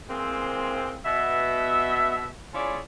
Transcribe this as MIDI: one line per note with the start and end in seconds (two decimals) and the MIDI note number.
0.09 0.98 52
0.09 0.98 56
0.09 0.98 58
0.09 0.98 60
1.05 2.25 47
1.05 2.25 76
2.53 2.78 61
2.53 2.78 64
2.53 2.78 65
2.53 2.78 68
2.53 2.78 73
2.53 2.78 74